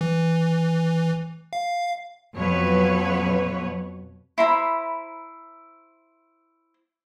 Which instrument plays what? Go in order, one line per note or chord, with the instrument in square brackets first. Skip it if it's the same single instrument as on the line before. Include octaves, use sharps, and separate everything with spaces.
[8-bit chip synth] E3
F5
[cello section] F2 B2 F#3 B4 C#5
[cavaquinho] E4 C5 A#5 B5